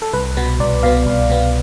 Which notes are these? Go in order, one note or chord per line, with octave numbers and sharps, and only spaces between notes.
A4
C2 B4
B2 B3
C2 D5
B2 B3 F5
C2
B2 B3